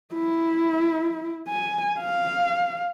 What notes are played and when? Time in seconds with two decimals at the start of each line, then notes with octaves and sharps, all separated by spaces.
0.14 E4
1.48 G#5
1.99 F5